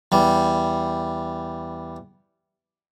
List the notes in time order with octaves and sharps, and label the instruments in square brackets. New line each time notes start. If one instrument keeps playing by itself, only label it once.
[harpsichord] E2 G3